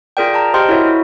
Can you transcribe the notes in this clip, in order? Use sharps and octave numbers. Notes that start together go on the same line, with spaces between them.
F4 G#4 A#4 D5 G5
A5 A#5
G4 C5 D#5 G5 C6 F6
E4 F#4 A#4 C#5 E5
E4